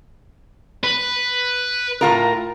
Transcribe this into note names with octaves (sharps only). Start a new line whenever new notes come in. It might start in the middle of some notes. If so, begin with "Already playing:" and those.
B4
A2 F4 A#4